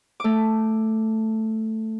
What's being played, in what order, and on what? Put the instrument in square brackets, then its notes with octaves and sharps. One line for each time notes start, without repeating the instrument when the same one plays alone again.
[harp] A3 D6